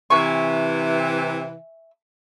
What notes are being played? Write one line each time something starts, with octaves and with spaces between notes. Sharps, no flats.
C3 E3 E5 G#5 C#6